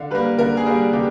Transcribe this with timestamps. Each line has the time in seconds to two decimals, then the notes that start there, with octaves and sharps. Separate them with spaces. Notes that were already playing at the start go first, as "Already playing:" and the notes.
Already playing: D3 F5
0.11 G3 A#3 B4
0.39 D3 A#4
0.57 G#4
0.66 G3 A#3
0.93 D3 G4